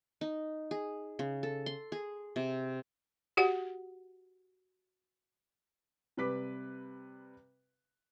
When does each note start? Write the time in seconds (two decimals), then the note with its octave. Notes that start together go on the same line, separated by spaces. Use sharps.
0.21 D#4
0.71 G#4
1.19 C#3
1.43 A4
1.66 C6
1.92 G#4
2.36 C3
3.37 F#4 G4 F#5
6.17 C3 G3 B4 D6 B6